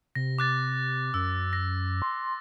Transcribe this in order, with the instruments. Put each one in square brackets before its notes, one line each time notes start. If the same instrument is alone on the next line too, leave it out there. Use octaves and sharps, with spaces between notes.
[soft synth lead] C3 [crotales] A#6
[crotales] D6 F#6 A6
[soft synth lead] F#2 [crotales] E6
[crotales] A#6
[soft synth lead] C6